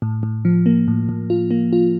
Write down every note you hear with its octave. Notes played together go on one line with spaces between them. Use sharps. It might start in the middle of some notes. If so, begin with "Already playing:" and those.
A2
A2
F3
A#3
A2
A2
F4
A#3
F4